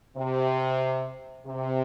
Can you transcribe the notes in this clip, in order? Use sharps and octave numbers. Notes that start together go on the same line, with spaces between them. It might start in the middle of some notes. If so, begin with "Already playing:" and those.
C3
C3